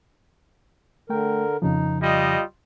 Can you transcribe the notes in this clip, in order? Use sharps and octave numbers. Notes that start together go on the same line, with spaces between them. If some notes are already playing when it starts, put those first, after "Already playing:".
D3 A3 A#4 G5
F2 C#3 F3 D#4
G3 F4 D#5